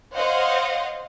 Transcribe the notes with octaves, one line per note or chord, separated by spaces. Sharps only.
C5 C#5 D#5 F5 F#5